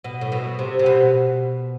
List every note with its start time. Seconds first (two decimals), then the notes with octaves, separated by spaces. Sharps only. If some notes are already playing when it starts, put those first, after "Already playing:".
0.04 B2
0.21 A2
0.32 B2
0.59 C3
0.79 C3
0.86 B2